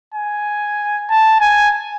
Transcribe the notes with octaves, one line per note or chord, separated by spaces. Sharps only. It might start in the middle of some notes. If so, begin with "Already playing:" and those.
G#5
A5
G#5